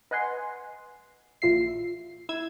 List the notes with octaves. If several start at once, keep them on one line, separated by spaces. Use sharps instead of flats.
B4 D#5 F#5 G#5 C6
A#1 A#2 F4 E5 C7
E4 E6 G#6